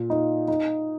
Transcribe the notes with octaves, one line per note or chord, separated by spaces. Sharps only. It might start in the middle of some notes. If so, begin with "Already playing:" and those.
Already playing: A#2
D#4
D#4